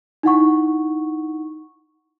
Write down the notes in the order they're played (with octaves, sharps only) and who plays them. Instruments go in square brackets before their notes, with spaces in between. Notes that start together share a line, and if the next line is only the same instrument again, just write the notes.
[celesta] D#4 E4 F#5 C#6